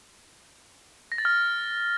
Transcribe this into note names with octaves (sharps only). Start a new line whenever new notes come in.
A#6
A6
F6